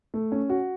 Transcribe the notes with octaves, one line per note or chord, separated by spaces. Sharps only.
A3
C#4
F#4